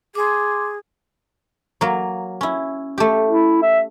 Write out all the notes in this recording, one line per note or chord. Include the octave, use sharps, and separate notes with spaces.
G#4 C6 D6
F#3 A#3
C#4 E4
A3 G4
E4
E5